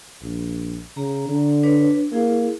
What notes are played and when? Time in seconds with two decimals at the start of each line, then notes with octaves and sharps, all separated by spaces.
0.22 A#1
0.97 C#3 A#5
1.29 D3
1.63 D4 B4 C#5
2.12 A#3 E4 G#4